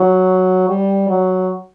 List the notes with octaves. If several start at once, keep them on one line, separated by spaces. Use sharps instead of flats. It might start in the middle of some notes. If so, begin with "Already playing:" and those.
Already playing: F#3
G3
F#3